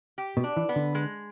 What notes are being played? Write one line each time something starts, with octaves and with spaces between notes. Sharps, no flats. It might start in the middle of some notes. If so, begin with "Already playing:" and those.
G4
B2
D4
E3
B3
D3
G#3